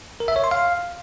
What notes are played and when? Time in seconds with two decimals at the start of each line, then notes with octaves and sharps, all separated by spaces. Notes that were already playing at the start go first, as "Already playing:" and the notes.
0.20 A#4
0.28 E5
0.36 C#5
0.44 C6
0.51 F5